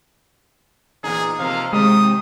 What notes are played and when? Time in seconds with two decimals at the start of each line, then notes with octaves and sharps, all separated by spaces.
1.04 E2 A#2 D#4 G#4
1.39 C3 F3 A#3 F5
1.73 C3 D#3 G#3 G4 D#6